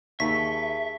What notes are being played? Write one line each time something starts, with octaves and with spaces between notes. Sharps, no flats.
D#2 G#4 E5 A5 C#6 B6